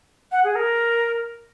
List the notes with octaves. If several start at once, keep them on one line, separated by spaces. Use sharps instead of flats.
F#5
G#4
A#4